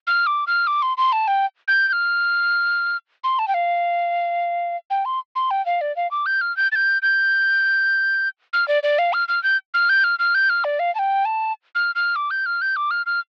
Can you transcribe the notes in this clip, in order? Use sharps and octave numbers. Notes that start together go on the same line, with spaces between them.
F6
D6
F6
D6
C6
C6
A5
G5
G6
G6
F6
C6
A5
G5
F5
G5
C6
C6
G5
F5
D5
F5
D6
G6
F6
G6
A6
G6
G6
F6
D5
D5
F5
F6
F6
G6
F6
G6
F6
F6
G6
F6
D5
F5
A5
G5
A5
F6
F6
D6
G6
F6
G6
D6
F6
F6